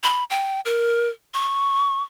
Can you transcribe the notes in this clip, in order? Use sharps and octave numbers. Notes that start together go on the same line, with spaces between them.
B5
G5
A#4
C#6